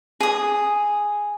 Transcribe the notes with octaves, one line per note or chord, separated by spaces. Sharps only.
G#4 D#6